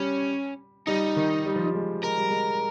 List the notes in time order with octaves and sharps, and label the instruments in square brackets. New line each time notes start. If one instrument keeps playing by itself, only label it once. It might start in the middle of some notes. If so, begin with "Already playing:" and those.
Already playing: [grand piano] G3 [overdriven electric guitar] C#4
[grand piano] G3 [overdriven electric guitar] D#4
[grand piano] D#3
G3
F3
G3
G#3
[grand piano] G#3 [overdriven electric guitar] A#4
[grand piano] G3
G#3